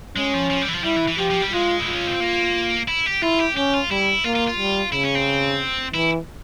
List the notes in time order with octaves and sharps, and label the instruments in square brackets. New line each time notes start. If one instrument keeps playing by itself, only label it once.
[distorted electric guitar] G#3 [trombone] C#4
[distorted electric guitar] F3
F3
G3
E3
F3
[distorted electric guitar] G3 [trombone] E4
[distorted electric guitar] E3
E3
[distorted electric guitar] F3 [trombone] G4
[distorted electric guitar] F3
G3
[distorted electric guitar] G#3 [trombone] F4
[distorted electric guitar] E4
[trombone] F4
[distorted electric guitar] C#4
C4
A#3
E4
G4
[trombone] E4 [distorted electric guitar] F4
[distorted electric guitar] G4
[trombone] C#4 [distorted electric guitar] G4
[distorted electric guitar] F4
[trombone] G3 [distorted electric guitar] E4
[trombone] A#3 [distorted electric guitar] F4
[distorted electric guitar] F4
F4
[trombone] G3
[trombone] C#3 [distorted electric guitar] E4
[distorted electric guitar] C#4
C4
[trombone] E3 [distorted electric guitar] E4